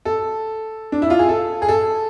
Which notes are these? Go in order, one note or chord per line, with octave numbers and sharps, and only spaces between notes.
A4
D4
E4
F4
G#4
A4
G#4
A4